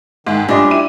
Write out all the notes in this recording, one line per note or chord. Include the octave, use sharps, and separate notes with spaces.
G#2 D#3
G2 C#4 D4 F4 G4 D#5 C6
E4 G4 D#7